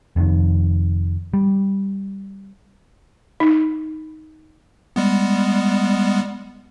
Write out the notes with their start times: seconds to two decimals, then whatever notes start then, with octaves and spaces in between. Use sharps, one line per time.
0.16 F1 F2 G#2 D#3
1.34 G3
3.40 D#4
4.96 G3 G#3 B3